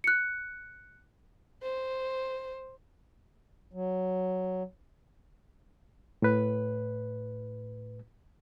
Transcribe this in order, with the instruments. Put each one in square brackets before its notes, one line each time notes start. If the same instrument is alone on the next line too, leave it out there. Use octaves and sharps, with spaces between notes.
[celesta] F#6 C#7
[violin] C5
[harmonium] F#3
[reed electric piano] A2 B4